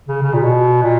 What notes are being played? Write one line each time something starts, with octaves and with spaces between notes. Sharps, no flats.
C#3
C#3
A#2
B2
A#2